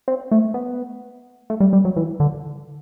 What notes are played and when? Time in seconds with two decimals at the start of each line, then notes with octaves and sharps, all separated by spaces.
0.08 C4
0.31 A3
0.54 B3
1.50 A3
1.60 G3
1.73 G3
1.85 F#3
1.97 E3
2.20 D3